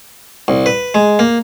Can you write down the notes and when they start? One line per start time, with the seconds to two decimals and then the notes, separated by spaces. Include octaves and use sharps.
0.48 C2
0.66 B4
0.95 G#3
1.19 A#3